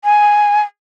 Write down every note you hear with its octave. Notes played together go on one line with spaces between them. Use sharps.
G#5